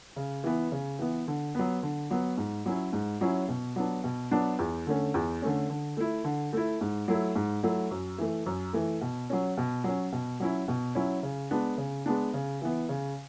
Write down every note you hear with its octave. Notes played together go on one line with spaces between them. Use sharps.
C#3
E3 B3
C#3
E3 B3
D3
F#3 B3
D3
F#3 B3
G#2
F#3 C#4 E4
G#2
F#3 C#4 E4
B2
F#3 B3 D4
B2
F#3 B3 D4
E2
D3 A3 C#4
E2
D3 A3 C#4
D3
A3 E4
D3
A3 E4
G#2
F#3 A3 E4
G#2
F#3 A3 E4
F#2
E3 A3
F#2
E3 A3
B2
F#3 C#4
B2
F#3 C#4
B2
F#3 C#4 E4
B2
F#3 C#4 E4
C#3
G#3 B3 D4
C#3
G#3 B3 D4
C#3
E3 B3
C#3